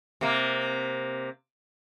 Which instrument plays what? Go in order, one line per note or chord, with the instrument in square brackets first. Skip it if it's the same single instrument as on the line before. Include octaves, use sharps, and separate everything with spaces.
[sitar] C3 A#3